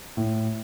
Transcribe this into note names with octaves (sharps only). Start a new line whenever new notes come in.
A2